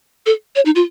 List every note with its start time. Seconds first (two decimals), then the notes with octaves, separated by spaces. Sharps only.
0.26 A4
0.56 C#5
0.65 D#4
0.75 F4